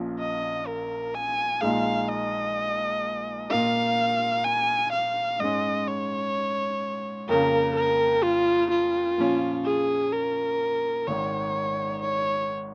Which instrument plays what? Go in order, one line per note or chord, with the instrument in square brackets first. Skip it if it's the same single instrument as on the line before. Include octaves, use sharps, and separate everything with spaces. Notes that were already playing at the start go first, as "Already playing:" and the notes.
Already playing: [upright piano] A#1 A#2 F3 C#4
[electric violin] D#5
A#4
G#5
[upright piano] A#1 A#2 G#3 D#4 G#4 [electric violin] F5
[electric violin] D#5
[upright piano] A#2 A#3 F4 [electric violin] F5
[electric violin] G#5
F5
[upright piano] G#2 G#3 C#4 [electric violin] D#5
[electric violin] C#5
[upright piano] F2 C#3 A#3 [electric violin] A#4
[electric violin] A#4
F4
F4
[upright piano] A#2 F3 C#4
[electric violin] G#4
A#4
[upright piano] G#1 G#2 D#3 [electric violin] C#5
[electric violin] C#5